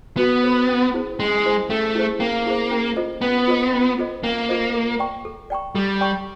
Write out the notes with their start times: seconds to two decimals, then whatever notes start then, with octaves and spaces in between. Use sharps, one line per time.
0.17 B3 F#4
0.43 A4 C5
0.69 C#4
0.94 E4 G#4 C5
1.19 G#3 C#4
1.45 E4 G#4 C5
1.70 A3 C#4
1.95 E4 G#4 C5
2.20 A#3 C#4
2.46 E4 G#4 C5
2.71 C#4
2.96 F4 A4 C5 D#5
3.21 B3 C#4
3.47 F4 A4 C5 D#5
3.73 C#4
3.98 F4 A4 C5 D#5
4.24 A#3 C#4
4.49 F4 A4 C5 D#5
4.74 A4
4.99 D5 G5 A#5 C#6
5.25 A4
5.50 D5 G5 A#5 C#6
5.75 G3 A4
6.01 D5 G5 A#5 C#6